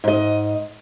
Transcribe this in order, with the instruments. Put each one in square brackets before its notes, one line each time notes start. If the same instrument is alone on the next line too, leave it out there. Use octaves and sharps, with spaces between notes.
[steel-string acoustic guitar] G#2 D#5